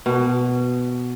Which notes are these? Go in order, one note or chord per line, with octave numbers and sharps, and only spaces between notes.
B2